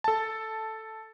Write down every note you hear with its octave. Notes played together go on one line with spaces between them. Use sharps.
A4 A5